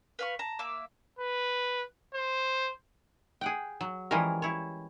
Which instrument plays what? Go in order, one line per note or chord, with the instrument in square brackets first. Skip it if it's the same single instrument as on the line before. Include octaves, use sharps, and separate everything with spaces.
[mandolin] B4 F5 C#6
A5 A#5
A#3 E5 D6
[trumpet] B4
C5
[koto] G#4 F#5 G5
F#3
E3 F3 G3 G#3 C#4 A#4
E4 C#5